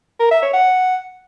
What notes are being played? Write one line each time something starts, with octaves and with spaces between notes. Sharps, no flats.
A#4
E5
C#5
F#5